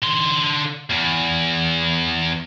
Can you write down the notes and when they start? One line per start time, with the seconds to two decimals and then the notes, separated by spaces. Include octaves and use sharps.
0.02 D3 C6
0.91 E2